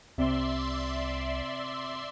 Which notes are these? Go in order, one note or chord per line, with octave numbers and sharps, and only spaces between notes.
C2 C3 D5 E5 C6